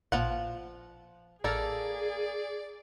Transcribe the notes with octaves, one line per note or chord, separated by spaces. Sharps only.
A1 A#2 F3 F4 F#5
A1 A#3 G#4 A4 D5 F6